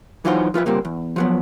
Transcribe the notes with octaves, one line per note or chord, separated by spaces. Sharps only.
E3 F#3 D#4 F4 F#4 C5
F3 F4 B4 E5
C#2 A#2 G3 A#3 C4
E2
F3 F#3 B3